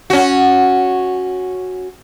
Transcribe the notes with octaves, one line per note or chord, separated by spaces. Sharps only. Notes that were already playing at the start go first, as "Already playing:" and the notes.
C#4 F#4